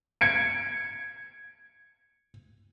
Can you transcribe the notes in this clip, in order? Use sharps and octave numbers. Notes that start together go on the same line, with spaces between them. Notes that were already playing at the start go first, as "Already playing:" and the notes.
G#6 C#7 D7